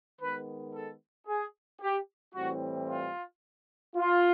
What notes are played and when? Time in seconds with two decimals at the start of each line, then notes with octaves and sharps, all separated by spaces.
0.19 D#3 G#3 B3 B4
0.73 A4
1.27 G#4
1.80 G4
2.34 A2 E3 G3 C4 F#4
2.89 F4
3.96 F4